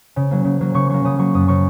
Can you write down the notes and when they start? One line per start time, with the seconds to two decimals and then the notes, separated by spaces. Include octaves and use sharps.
0.16 C#3
0.31 F#3 A#3
0.45 C#3
0.60 F#3 A#3
0.74 C#3 C#6
0.90 F#3 A#3 C#6
1.05 C#3 D#6
1.18 F#3 A#3 C#6
1.34 F#2 D#6
1.48 C#3 A#3 C#6